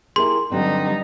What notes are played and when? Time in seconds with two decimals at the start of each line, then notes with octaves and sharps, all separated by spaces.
0.16 E4 G4 G#4 A#4 C6
0.52 G2 D3 F#3 G3 C4 D#4